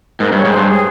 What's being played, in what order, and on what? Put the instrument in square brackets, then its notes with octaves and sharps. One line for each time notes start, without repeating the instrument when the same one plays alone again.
[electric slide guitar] G#2 [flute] A#4
[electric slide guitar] G2 [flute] C#5
[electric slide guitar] G#2
[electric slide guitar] G2 [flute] C5
[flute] G#4